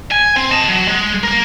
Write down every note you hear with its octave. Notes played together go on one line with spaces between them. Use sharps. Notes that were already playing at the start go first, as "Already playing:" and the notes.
G#5
C4
D#5 A5
F#3
G#3
A#3 A#4